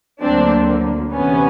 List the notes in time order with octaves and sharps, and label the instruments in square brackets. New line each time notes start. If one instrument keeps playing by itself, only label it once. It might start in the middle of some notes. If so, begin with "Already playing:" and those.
[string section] D2 D3 F#3 A#3 C4 D4
D2 C3 E3 B3 C#4